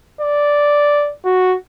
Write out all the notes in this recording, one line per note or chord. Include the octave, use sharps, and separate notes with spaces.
D5
F#4